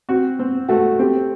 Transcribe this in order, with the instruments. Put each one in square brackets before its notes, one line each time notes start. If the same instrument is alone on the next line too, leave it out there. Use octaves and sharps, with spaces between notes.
[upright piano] C4 [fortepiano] F#4
[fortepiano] C4
[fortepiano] A3 [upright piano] F#4
[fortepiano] C4 [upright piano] G4